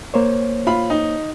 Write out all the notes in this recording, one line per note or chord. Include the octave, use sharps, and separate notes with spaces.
A#3 C5 C#5
F4 B5
D#4